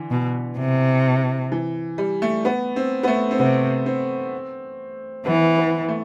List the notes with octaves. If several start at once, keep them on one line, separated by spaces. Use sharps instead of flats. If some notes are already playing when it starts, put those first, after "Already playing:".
Already playing: D3 E3
B2
C3
E3
G3
A3
B3
C4
B3
A3
C4
C3 B3
C4
E3 B3
B3
A3